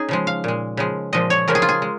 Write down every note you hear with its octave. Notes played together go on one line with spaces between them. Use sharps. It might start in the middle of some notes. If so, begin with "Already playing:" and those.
Already playing: C#4 D#4 G#4
C#3 F3 G#3
F5
A#2 G#3
C#3 F3 G#3
A#2 F3 G#3 D#5
C#5
C#3 F3 G#3 A#4
G#4
F4
G#4
G#3